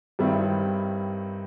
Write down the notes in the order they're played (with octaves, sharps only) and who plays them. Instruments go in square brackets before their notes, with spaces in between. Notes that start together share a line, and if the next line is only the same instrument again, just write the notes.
[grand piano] G2 D#3 G3 C4 E4